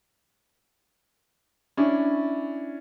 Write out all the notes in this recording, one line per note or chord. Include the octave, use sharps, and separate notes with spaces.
C#4 D4 E4